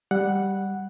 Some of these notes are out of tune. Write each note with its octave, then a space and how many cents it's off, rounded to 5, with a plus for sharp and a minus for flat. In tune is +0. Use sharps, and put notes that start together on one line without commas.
G3 +0 F#5 +0